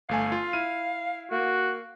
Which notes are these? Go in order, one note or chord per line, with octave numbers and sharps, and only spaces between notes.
G1 A3 F5 G#5
F4
E4 F6 D#7
A#3 F#4